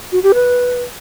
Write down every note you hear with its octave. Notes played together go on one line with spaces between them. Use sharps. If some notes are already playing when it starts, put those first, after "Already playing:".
F#4
G4
B4